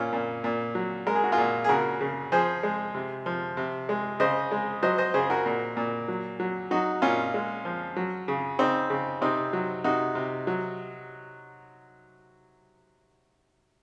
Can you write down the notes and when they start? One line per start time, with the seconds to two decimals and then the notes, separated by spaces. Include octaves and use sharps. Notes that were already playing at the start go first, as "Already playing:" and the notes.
Already playing: A#2 C#4 F4
0.13 A#2
0.44 A#2
0.75 F#3
1.07 G#3 A#4
1.15 G#4
1.24 F#4
1.32 F4 G#4
1.38 A#2
1.64 G#4
1.69 C#3 F#4 A#4
2.01 C#3
2.32 F3 G#4 C5
2.63 G#3
2.95 C3
3.26 F3
3.57 C3
3.89 G#3
4.20 C#3 C5 D#5
4.51 G#3
4.83 F#3 C5 D#5
4.98 C5 D#5
5.14 C#3 G#4 C5
5.30 F#4 A#4
5.46 A#2
5.77 A#2
6.08 F#3
6.40 F#3
6.71 F#3 D#4 F#4
7.02 A#2 C#4 F4
7.34 G#3
7.65 F3
7.96 F#3
8.28 C#3
8.59 C#3 C4 D#4
8.90 C#3
9.21 C3 C4 D#4
9.53 F#3
9.84 C3 D#4 F#4
10.15 C3
10.47 F#3